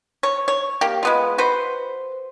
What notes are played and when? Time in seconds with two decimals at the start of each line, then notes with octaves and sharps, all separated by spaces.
0.23 C#5
0.48 C#5
0.81 A#3 G4
1.03 G#3 B3 F4
1.38 F#4 B4 C5